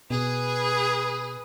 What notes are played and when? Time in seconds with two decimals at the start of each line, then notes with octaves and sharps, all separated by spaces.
0.10 B2 G#4 B4 D#6